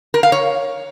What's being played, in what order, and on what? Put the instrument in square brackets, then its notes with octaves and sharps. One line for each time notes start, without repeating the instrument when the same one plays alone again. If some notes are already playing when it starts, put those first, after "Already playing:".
[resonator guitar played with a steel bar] A#4
F5
C#5